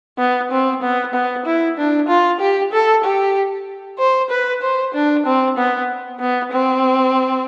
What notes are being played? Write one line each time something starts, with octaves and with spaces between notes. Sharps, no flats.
B3
C4
B3
B3
E4
D4
F4
G4
A4
G4
C5
B4
C5
D4
C4
B3
B3
C4